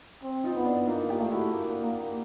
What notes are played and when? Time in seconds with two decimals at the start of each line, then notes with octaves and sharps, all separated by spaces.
0.23 C4
0.44 D#4 F4
0.55 B3
0.66 D4 E4
0.88 A#3 D#4 F4
1.09 F4 G4
1.20 A3
1.31 E4 F#4
1.53 A#3
1.86 A#3